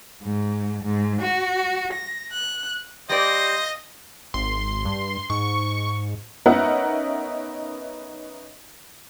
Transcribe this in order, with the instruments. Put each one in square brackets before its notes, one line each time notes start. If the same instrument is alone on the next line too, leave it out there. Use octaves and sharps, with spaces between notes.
[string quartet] G#2
G#2
F#4
A#6
F#6
[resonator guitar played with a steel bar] G3 D5 [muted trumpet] C5 [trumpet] D#5 [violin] F5 A#6
[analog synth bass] G#1 [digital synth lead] C6
[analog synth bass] G2
[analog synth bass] G#2 [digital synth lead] C#6
[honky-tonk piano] B3 C#4 D#4 A#4 E5 F#5